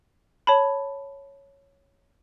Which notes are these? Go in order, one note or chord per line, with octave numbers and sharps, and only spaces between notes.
C#5 A5 B5